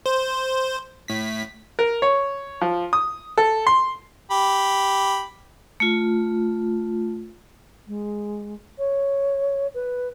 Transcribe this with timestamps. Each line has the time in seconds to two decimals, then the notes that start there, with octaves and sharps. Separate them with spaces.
0.06 C5
1.08 A2 B6
1.79 A#4
2.02 C#5
2.61 F3
2.93 D#6
3.38 A4
3.67 C6
4.31 G4 B5
5.80 A3 F4
7.87 G#3
8.78 C#5
9.74 B4